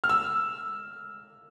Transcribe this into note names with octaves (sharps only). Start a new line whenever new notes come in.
F6
E6